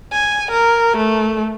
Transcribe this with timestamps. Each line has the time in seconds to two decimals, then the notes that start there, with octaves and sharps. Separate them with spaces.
0.13 G#5
0.51 A#4
0.97 A3